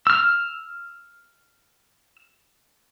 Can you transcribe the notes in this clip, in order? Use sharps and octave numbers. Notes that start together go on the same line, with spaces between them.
E6 F6